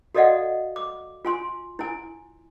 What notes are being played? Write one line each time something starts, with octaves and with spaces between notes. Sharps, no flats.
F#4 A4 D5 D#5 F5 F#5
D6
F4 G#5 C6
E4 G#5